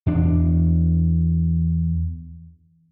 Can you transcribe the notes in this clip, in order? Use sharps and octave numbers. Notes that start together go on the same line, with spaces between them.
E2 D4